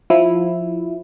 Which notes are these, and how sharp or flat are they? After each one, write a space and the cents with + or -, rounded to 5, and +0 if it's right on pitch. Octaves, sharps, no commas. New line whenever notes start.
F3 +10 E4 +0